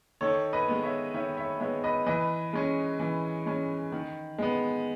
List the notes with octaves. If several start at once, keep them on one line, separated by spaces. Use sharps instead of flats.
D#3 A4 C#5
B4 D#5
G#3 B3
C#5 E5
D#3 C#5 E5
C#5 E5
G#3 B3 C#5 E5
B4 D#5
E3 B4 D#5
G#3 C#4
E3
G#3 C#4
D#3
G#3 B3